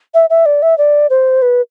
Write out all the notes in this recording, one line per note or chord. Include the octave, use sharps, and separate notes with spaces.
E5
E5
D5
E5
D5
C5
B4